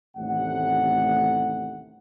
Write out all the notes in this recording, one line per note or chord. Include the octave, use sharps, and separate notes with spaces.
A1 D#2 C3 G3 A3 F#5